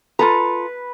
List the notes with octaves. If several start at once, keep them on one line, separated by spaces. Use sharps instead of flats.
F4 A4 B4 A#5